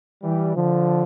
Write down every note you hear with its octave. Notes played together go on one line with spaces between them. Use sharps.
E3 G3
D3 F3